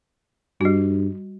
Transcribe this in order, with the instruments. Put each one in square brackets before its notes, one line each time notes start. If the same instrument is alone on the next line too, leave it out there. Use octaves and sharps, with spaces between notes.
[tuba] G2 [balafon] G3 F#4